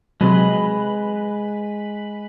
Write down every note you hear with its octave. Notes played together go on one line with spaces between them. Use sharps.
C3 F#3 G#3 B4